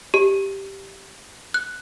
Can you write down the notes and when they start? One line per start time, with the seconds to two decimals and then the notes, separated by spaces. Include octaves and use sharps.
0.14 G4
1.54 F#6